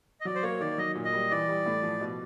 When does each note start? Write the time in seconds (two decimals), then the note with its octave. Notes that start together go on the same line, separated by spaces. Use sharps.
0.21 D#5
0.25 F#3 D5
0.35 C5
0.43 A#3 C#5
0.60 D#3 D5
0.78 F#3 D#5
0.95 A#2
1.05 D#5
1.13 G3
1.31 E3 D5
1.49 G3
1.66 A2
1.83 F3
2.01 B2